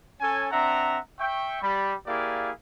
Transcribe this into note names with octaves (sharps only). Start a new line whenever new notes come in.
C#4 A4 C#5 G#5
C4 D4 E5 F#5 A#5
E5 G5 C#6
G3 B5
A#3 E4 G4 G#4 D5 F5